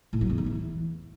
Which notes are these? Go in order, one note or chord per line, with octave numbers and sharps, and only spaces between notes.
A2
F#3
E2
D#3
E3